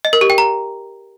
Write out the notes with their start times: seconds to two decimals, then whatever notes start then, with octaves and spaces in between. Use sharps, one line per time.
0.05 D#5
0.13 A#4
0.21 G4
0.30 G5
0.38 A#5